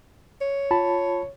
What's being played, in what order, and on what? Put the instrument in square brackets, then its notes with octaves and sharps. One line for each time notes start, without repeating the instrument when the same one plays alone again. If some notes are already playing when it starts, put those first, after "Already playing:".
[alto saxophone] C#5
[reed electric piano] F4 A5 B5